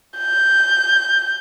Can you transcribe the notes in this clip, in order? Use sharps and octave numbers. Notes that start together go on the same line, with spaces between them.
G6